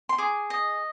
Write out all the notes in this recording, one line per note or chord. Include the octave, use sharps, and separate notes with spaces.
C6
G#4 D6
D#5